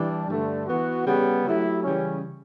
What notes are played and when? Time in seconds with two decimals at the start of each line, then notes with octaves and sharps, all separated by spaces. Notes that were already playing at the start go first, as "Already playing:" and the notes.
Already playing: E3 G3 D4
0.26 G2 D3 A3 D4
0.66 E3 B3 F#4
1.05 C#3 G3 B3
1.44 F#3 A3 E4 G4
1.83 C#3 E3 G3 C#4